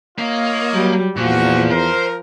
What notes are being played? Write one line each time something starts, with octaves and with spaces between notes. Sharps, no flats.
A#3 F4 C#5 D#5
F#3 G3
E2 A#2 F3 F#4
A#4 C5